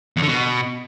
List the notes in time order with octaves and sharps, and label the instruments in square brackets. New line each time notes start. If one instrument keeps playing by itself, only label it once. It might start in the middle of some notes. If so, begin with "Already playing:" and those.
[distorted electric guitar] E2
D3
B2